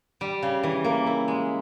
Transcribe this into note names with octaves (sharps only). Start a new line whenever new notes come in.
G3
C#3
E3
A#3
E4
G#3